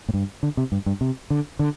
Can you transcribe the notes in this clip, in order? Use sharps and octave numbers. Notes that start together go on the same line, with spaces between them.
A2
G2
D3
C3
G2
G2
C3
D3
D3